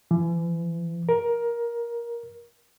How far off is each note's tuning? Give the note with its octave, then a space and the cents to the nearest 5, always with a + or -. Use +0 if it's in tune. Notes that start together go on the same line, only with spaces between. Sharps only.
E3 +40
A#4 +15